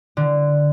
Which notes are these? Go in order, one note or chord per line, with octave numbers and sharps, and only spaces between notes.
D3